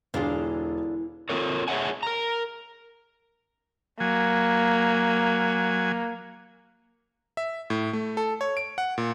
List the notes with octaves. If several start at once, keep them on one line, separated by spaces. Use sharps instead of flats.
E1 D3 E3 D4 F4 G#4
C4 F4 A4 A#4 C#5
G#4 C#5 D5 E5 F#5 G#5
A#4 A#5
F#3 A#3 G#5
E5
A2
A3
A4
C#5
D7
F#5
A#2